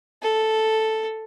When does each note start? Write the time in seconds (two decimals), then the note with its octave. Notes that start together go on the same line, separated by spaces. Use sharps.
0.22 A4